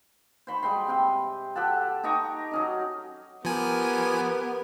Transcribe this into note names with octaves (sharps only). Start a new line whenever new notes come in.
C5 B5 C#6
G3 G#3 G5 C6
C3 G5
G4 A4 F#5 A5
D#4 G4 A#5 C#6
F#3 C#4 D#4
F3 B3 G4 A#4 G#5